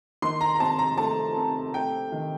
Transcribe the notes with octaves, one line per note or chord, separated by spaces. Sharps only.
D#3 C6
A#5
A#5
C3 A5
A#5
A3 A5
C3
A3 G5
D#3